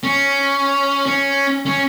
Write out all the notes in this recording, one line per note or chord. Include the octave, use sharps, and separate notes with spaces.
C#4
C#4
C#4